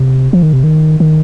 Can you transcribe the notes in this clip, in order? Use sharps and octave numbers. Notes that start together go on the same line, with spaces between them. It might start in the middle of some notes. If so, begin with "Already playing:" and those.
Already playing: C3
F3
D#3
C3
D#3
D#3